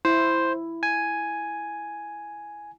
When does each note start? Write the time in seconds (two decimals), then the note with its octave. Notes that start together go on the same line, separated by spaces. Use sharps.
0.05 E4 C5
0.83 G#5